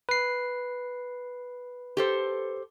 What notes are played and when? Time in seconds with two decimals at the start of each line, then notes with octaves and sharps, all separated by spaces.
0.09 B4 C7
1.97 G4 A4 C5